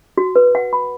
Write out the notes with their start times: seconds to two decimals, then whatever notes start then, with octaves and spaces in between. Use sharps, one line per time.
0.18 F#4
0.36 B4
0.55 F#5
0.73 B5